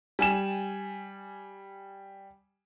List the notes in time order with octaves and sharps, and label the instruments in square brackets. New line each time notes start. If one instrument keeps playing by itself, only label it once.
[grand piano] G3 G#5 E7